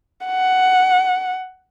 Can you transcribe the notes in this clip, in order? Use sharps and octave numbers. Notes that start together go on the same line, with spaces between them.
F#5